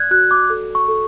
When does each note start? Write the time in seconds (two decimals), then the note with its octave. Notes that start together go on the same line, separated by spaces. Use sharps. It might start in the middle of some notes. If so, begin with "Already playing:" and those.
Already playing: D5 F#6 G#6
0.11 F#4 F#6
0.31 D6
0.50 A4
0.75 C#6
0.88 A4